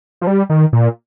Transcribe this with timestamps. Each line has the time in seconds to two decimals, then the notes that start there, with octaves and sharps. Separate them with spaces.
0.21 F3
0.27 G3
0.50 D#3
0.73 A#2